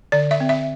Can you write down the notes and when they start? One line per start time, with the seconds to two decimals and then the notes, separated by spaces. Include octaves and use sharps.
0.12 D3 D5
0.31 E5
0.40 C4
0.49 E5